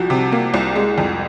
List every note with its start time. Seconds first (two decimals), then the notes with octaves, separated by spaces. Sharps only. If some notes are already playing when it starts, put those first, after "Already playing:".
Already playing: C2 F3 F#4
0.10 C3
0.32 A#3
0.54 C2
0.76 G#3
0.98 F2